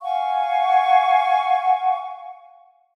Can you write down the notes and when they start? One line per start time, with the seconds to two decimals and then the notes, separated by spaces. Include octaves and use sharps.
0.01 F5 F#5 G#5 C#6